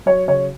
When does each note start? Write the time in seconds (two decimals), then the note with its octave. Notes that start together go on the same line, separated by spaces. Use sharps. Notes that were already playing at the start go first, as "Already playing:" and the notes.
0.06 F#3 C#5
0.28 C#3 C#5